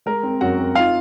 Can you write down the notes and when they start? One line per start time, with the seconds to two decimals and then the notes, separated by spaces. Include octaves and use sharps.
0.06 G#3 A#4
0.23 C4
0.41 F#2 F#4 F#5
0.58 C4
0.75 D#4 F4 F5